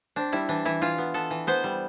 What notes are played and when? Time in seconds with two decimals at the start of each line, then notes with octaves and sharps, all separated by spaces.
0.16 C4 D4
0.32 G3 E4
0.49 E3 D4
0.65 E3 E4
0.81 E3 F4
0.98 B3
1.14 B3 A4
1.31 E3
1.47 B3 C5
1.64 G3